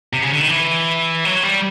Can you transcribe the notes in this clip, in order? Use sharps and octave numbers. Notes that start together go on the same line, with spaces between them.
C3
C#3
D3
D#3
E3
F#3
G3